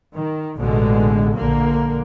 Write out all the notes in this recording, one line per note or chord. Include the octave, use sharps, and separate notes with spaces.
D#3
A1 B2 D3 G#3
A#1 D3 A#3